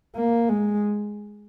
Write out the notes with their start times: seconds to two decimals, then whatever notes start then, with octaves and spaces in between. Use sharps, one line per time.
0.15 A#3
0.49 G#3